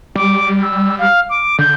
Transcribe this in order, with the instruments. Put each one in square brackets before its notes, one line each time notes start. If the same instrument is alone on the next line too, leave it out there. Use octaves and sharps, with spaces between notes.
[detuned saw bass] G3 [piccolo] D6
[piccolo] E6
F5
D6
[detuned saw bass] D3 [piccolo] G6